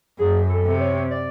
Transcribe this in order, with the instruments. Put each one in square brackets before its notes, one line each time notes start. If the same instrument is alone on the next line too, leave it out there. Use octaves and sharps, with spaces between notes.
[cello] F#2 [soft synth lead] G#4
[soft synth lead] A4
[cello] C3
[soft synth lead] C#5
D5